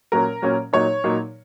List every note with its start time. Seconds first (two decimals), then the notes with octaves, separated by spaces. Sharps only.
0.12 A#2 F#3 C#4 A#4
0.42 A#2 F#3 C#4
0.73 A#2 F#3 D#4 C#5
1.04 A#2 F#3 D#4